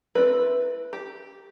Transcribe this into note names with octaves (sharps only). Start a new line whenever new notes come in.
A3 C4 E4 B4
G4